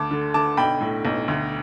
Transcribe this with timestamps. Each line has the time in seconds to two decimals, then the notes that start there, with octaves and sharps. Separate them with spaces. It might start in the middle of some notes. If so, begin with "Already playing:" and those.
Already playing: D2 A5 D6
0.11 D3
0.34 D3 A5 D6
0.57 B1 G5 B5
0.80 A2
1.05 B1
1.28 D2